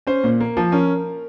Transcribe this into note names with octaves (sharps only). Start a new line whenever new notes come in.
C#4 C5
A#2
A#3
F3
C#4 A#4